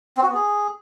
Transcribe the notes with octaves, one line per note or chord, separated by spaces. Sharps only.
C4
F#4
B3
G#4